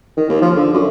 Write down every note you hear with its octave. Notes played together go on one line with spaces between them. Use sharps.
D#3
D#2
F3
D3
F#2